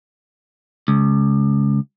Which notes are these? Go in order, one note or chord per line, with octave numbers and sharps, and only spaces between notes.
C#2